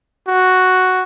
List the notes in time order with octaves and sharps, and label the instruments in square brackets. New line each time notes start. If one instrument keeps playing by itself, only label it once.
[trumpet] F#4